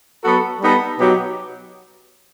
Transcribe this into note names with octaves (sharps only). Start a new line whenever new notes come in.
F#3 B3 F#4 A4
G3 B3 D#4 A4
B2 F#3 B3 D#4 G4